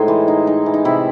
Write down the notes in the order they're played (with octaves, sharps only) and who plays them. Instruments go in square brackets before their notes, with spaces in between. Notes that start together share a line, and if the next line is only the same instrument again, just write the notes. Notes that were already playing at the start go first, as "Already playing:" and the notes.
Already playing: [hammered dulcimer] A2 G#3 D#4 C5
E3
D#4
D#4
E3
D#4
C3 E4